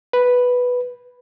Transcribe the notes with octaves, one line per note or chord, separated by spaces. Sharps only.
B4